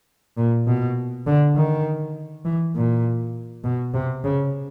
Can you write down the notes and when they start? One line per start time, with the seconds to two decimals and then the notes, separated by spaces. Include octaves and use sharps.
0.37 A#2
0.67 B2
1.27 D3
1.56 D#3
2.45 E3
2.75 A#2
3.64 B2
3.94 C3
4.24 C#3